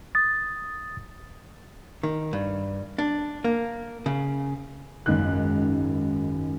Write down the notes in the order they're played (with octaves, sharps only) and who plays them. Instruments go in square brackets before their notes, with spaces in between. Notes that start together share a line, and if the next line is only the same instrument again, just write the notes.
[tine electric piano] D#6 A6
[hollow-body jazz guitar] D#3
G2
D4
A#3
C#3
[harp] G#1 F#2 [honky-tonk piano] C#2 D#3 F#6